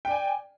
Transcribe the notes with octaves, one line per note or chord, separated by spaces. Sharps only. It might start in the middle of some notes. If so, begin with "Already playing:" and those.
D5 G5 G#5